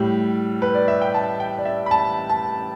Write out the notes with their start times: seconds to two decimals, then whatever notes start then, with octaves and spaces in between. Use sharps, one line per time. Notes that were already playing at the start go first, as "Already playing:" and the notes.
Already playing: A2 G3
0.62 B4
0.74 D5
0.88 E5
1.02 G5
1.14 A5
1.40 G5
1.58 D5
1.65 E5
1.86 B5
1.91 A5
2.29 A5